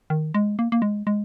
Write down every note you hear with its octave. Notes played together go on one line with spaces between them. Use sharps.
D#3
G#3
A#3
A#3
G#3
G#3